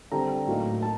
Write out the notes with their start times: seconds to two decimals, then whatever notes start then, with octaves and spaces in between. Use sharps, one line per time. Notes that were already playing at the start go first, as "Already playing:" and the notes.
0.12 D3 G3 C4 A#5
0.47 A2 F#3 A#3 D#4
0.82 A5